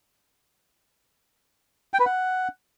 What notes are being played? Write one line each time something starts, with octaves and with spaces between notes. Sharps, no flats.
G5
B4
F#5